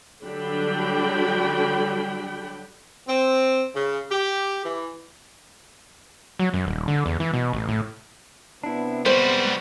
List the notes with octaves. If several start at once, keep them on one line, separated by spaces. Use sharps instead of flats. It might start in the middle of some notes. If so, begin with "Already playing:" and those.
D3 F#3 G3 D4 G5 B5
C4
C#3
G4
E3
F#3
F#2
D#1
D3
E2
E3
B2
A1
A2
C3 B3 D4 E4
G3 G#3 F#4 C5